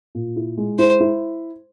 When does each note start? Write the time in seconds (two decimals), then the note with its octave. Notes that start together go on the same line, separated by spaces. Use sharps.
0.15 A#2
0.36 E4
0.57 G#3
0.79 E4 C5
1.00 E4